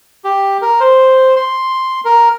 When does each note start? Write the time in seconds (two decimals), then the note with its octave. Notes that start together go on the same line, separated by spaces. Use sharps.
0.24 G4
0.62 A#4
0.80 C5
1.36 C6
2.05 A#4